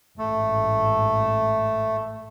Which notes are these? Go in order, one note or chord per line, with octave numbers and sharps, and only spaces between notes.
A1 G#2 A3